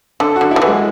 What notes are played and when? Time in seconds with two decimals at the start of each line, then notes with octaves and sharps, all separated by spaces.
0.20 D3 A4
0.36 F#4
0.41 D3
0.51 E4
0.56 D3
0.62 E3
0.67 G#3